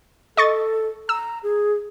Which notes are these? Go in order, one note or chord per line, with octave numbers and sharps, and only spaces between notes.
A4 D#5 C#6 A6
A#5 E6
G#4